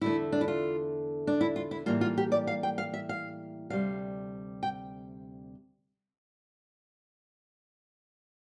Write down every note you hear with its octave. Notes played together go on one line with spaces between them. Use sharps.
E2 D3 A3 E4
D4
E4
F4
D4
E4
F4
E4
A2 E3 G3 A#3 F4
F4
G4
D5
F5
G5
F5
E5
F5
D2 C3 G3 F5
G5